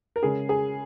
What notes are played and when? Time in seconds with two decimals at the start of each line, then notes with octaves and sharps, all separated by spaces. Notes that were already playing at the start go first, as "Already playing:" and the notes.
0.16 A#4
0.22 C#3 G#3 C#4 G#4
0.49 G#4